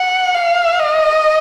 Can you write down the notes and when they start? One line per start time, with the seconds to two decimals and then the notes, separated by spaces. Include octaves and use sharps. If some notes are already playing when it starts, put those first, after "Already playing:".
Already playing: F#5
0.34 F5
0.80 D#5